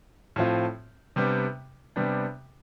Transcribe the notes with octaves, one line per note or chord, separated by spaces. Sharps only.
A2 F3 C4 F4
C3 G3 B3 D4
C3 G3 B3 D4